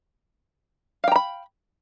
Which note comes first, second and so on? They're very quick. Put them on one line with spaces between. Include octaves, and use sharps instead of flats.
F5 G5 A#5 B5